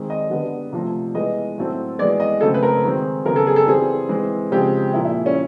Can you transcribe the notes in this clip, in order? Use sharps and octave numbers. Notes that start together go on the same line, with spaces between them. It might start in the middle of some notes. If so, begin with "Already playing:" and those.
Already playing: D#3 G#3 C4
D#5
D3 G3 B3
C3 F3 A3
E3 G#3 B3 D#5
A2 F#3 A3 C4
E3 G#3 B3 D5
D#5
C#3 F#3 A3 C4 A4
B4
A#4
D#3 G#3 C4
C#3 F#3 B3 A#4
A4
G#4
A4
E3 G3 C4 G#4
E3 G#3 C4
C#3 F3 G#3 C4 G4
A#2 F3 A#3 E4
E4
C#4